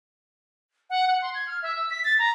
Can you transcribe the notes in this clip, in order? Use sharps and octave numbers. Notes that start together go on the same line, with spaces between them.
F#5
F#5
C6
G#6
F6
E5
E6
B6
A6
A#5